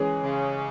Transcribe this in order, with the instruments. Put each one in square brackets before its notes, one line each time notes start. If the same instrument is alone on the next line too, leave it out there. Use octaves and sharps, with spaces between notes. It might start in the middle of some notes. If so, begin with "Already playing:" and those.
Already playing: [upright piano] E3 G#3 C#4 G#4
[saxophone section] C#3